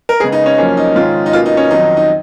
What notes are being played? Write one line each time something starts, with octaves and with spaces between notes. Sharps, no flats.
A#4
C#3 G#3 B3 G#4
D#4
C#4
F#2 F3 A#3 C#4
D#4
G#2 D#3 G#3 C#4 F4
D#4
B2 A#3 C#4 F4
D#4
C#4
F2 D#3 F#3 D#4
D#4